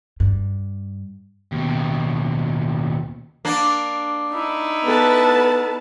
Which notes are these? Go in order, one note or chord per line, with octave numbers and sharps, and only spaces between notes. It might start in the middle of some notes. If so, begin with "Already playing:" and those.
G2
D#2 B2
A#3 D4
D#4 E4
B3 A4 B4 A5